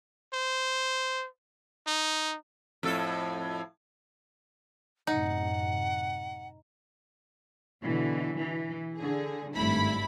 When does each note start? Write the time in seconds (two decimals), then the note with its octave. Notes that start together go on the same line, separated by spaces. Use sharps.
0.33 C5
1.87 D#4
2.83 F2 A2 A4
5.07 F#2 A2 C3 D#4 F#5
7.82 B2 D3 E3
8.39 E3
8.97 D3 G#4
9.54 G#1 G2 A3 E4 B5